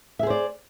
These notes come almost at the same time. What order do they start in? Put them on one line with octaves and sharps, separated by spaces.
E5 G#4 C5 D5